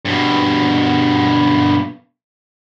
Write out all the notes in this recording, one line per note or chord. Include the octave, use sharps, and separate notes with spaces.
G2 B2